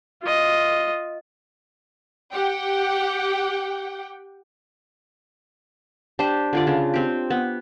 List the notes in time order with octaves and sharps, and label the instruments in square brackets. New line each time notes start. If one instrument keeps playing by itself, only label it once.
[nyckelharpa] F4 D#5
[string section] G4 F#5 G5
[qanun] D4 G4 C5
D3 F4 D5
C#3 D4
C4 G4
B3